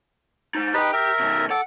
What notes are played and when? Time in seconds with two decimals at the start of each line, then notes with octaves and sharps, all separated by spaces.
0.55 D#4 C5
0.74 D#4 G4 B4 G5
0.93 A#4 E5
1.20 B2 D#3
1.50 A4 F#5 D6